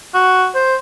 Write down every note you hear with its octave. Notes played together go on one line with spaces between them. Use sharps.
F#4
C5